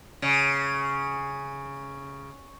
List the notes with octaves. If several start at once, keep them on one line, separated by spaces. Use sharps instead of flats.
C#3